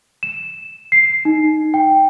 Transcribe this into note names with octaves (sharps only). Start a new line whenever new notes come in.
E7
C7
D#4
G5